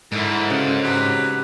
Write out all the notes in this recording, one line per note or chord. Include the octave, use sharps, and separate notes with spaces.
G#2 D3 E4 A#4
C#3 F#4 A#4
F#3 C4 G4 B4